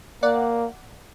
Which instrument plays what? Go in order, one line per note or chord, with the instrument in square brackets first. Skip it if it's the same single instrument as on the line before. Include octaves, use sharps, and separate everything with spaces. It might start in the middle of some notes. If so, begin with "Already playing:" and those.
[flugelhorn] A#3 [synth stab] D5 F#5